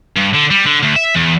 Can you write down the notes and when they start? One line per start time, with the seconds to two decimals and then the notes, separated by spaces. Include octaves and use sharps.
0.17 G2
0.34 D3
0.51 G3
0.66 D3
0.83 D2
0.96 E5
1.15 E2